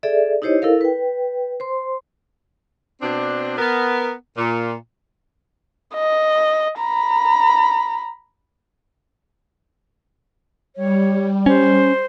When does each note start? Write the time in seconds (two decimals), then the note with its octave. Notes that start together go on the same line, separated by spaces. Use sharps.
0.03 G#4 A4 D5 E5
0.42 D#4 E4 G4 C5 C#5 D#5
0.62 E4 A4 A#4 F5
0.81 B4 G5
1.60 C5 C6
3.02 B2 C4 D4
3.58 B3 A#4
4.37 A#2
5.95 D#5
6.79 A#5 B5
10.76 G3 C#5
11.46 C#4 C5